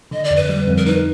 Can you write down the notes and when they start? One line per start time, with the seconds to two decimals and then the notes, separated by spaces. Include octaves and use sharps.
0.11 D3 D#5
0.24 D5
0.31 F2
0.36 B4
0.49 G3
0.68 F2
0.77 A#4
0.86 D#4 B4